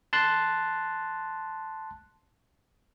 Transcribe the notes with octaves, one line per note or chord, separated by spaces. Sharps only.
A5 C6 F#6